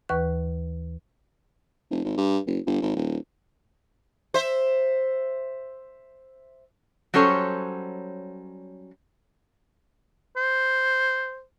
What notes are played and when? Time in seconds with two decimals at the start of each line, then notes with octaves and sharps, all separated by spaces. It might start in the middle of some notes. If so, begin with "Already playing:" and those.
0.09 D#2 E3 B4 C#6 F#6
1.91 F1
2.04 G#1
2.17 G2
2.47 F#1
2.66 G1
2.82 G#1
2.96 D#1
4.34 C5 E5
7.14 F#3 G3 C#4 A4 C5 C#5
10.37 C5